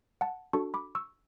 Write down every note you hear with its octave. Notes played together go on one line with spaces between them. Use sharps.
F#5 A5
D4 F#4 A4 A5 C#6
B5 D6
C#6 E6